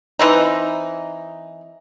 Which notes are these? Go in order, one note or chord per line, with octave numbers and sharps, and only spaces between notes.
E3 C4 D#4